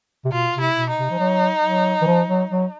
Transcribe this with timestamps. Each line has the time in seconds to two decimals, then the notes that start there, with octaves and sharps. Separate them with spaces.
0.25 C3
0.32 B2 F4
0.54 C3
0.61 E4
0.76 B2
0.90 D#4
0.98 C3
1.11 F3
1.19 F#3
1.64 F#3
2.01 E3
2.07 F3
2.28 F#3
2.50 F#3